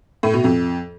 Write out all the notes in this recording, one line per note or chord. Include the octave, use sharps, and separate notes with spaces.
A2
B2
F2